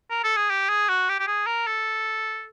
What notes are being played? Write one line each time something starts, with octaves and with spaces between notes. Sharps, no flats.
A#4
A4
G#4
G4
G#4
F#4
G4
G4
G#4
A#4
A4